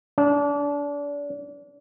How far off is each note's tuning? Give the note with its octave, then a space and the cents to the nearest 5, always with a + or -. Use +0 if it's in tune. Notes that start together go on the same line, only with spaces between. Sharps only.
D4 -30